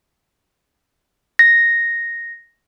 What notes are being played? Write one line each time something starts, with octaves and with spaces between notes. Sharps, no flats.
A#6